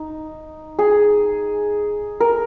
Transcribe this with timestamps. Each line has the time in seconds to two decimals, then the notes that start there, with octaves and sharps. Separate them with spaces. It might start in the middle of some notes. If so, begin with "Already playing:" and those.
Already playing: D#4
0.79 G#4
2.20 A#4